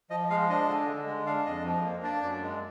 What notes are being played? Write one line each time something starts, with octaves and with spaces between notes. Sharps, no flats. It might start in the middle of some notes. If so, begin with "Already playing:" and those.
F3 D#5
G#3 F5
D4 D#5
D3
D3
G#3
D4 F5
F2 D#5
F3
A#3
D4 D5
F#2
G#3